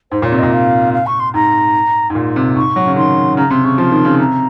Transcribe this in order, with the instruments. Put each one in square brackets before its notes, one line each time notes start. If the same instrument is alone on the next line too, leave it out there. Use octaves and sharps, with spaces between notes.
[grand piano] G#2 [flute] C5
[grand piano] A#2 [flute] C#5
[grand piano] C3
[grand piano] A#2 [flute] D#5
[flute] F5
F5
C#6
C6
[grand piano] G#2 [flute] A#5
[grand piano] G#2
A#2
C3
[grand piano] G#2 [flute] C#6
[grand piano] F#3
C#3
[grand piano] D#3 [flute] C6
[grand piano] C#3 [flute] A#5
[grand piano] C3 [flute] C6
[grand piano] C#3 [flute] C#6
[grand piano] F3 [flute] C6
[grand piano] D#3
C#3
[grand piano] C3 [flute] A#5